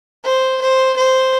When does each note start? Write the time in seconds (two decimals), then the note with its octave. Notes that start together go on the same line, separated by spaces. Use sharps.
0.25 C5
0.62 C5
0.97 C5